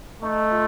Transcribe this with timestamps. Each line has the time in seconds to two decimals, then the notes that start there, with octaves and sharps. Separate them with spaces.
0.23 A3 D#4
0.51 F4